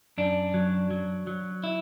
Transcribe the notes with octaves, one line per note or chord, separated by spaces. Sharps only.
F#2 D4
F#3
F#3
F#3
E4